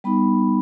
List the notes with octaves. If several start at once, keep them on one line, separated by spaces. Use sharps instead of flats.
G3 B3 D#4 B5